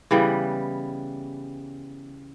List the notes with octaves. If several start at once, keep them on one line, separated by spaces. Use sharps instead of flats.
C#3 E3 G3 B3